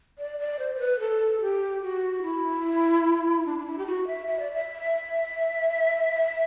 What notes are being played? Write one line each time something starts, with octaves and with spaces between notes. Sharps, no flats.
D5
D5
C5
C5
B4
A4
G4
F#4
E4
D4
D4
E4
G4
F#4
E5
E5
D5
E5